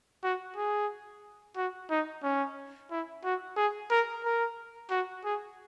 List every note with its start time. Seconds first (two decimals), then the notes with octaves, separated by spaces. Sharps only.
0.23 F#4
0.56 G#4
1.56 F#4
1.90 D#4
2.23 C#4
2.91 E4
3.24 F#4
3.57 G#4
3.90 A#4
4.24 A#4
4.91 F#4
5.25 G#4